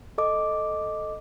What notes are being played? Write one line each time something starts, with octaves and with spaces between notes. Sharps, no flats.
A4 D#5 D6